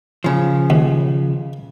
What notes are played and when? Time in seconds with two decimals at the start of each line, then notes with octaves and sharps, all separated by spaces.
0.24 C#3 F3
0.70 D#2